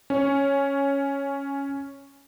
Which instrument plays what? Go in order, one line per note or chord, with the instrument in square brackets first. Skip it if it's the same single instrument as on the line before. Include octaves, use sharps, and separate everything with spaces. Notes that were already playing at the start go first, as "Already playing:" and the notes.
[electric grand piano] C#4 C#5